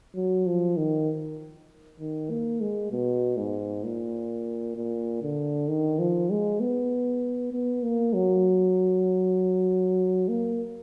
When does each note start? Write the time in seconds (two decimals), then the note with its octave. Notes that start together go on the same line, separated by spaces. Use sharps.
0.15 F#3
0.46 F3
0.77 D#3
2.00 D#3
2.30 A#3
2.61 G#3
2.91 B2
3.37 G#2
3.84 A#2
4.76 A#2
5.22 D3
5.68 D#3
5.98 F3
6.30 G#3
6.60 B3
7.52 B3
7.83 A#3
8.14 F#3
10.28 A#3